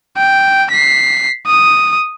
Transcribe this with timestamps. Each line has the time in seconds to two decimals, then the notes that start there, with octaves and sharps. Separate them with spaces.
0.17 G5
0.71 B6 C7
1.46 D#6